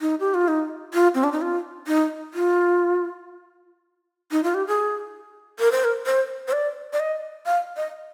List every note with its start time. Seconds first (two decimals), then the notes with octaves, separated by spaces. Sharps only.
0.01 D#4
0.20 G4
0.34 F4
0.48 D#4
0.94 F4
1.15 C4
1.24 D4
1.32 D#4
1.42 F4
1.87 D#4
2.34 F4
4.32 D#4
4.44 F4
4.54 G4
4.67 G#4
5.59 A#4
5.72 C5
5.84 A#4
6.06 C5
6.48 C5
6.53 D5
6.93 D5
7.00 D#5
7.46 F5
7.77 D#5